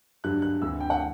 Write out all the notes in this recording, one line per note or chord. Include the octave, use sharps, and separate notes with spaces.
G2 D3 F#3 F#6
F#6
D2 C3 E3 E6
G5
F#5